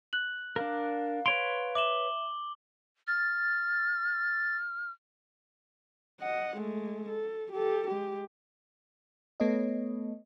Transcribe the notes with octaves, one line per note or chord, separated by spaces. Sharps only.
F#6 F#7
D4 A#4 F5
B4 C#5 C6 D7 F7
E5 D6 E7 F#7 G7
F6 A6
D#5 F#5
G#3 A3
A4
G4 A4
G#3 G4
A3 B3 A4 B4 C#5 D#5